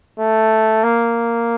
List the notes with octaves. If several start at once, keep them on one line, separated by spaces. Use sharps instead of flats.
A3
A#3